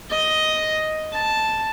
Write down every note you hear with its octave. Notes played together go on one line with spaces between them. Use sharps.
D#5
A5